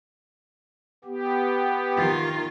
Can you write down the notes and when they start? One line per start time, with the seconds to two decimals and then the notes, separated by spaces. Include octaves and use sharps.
1.05 B3 G4
1.96 D#3 F4